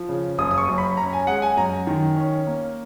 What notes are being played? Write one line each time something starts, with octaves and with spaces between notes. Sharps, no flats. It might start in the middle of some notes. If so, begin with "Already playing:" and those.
Already playing: F3
C#3
F#1 D#6
D#6
C#6
F#2
B5
C#4 A#5
G#5
G#3 F#5
G#5
F#2 A#5
D#3
C#4
A#3